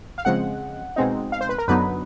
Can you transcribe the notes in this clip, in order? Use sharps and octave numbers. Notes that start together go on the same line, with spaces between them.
F5
C#3 F3 G#3 C4 F#5
B2 G#3 C4 D#4
F5
C5
B4
A#4
F#2 D3 F#3 B3 D#4 B4